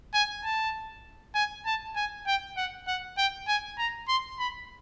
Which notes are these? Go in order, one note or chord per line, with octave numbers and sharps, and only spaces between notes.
G#5
A5
G#5
A5
G#5
G5
F#5
F#5
G5
G#5
A#5
C6
B5